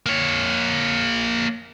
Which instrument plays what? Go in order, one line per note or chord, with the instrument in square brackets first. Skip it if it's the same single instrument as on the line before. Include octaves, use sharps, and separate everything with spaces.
[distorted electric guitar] A#3 C#5